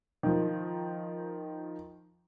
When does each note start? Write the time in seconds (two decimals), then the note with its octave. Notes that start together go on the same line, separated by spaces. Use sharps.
0.23 D#3 F3